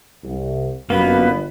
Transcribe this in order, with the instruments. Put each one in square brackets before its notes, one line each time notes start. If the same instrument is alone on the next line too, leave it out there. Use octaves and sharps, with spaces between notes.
[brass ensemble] C2
[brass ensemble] G1 [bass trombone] F#2 [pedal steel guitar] A#3 B3 [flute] B4